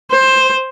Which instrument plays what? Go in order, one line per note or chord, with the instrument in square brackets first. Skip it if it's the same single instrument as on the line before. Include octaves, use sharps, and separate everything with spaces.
[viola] C5